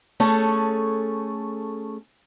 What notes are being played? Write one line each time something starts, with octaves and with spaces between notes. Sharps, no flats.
A3 C#4 G#4 A4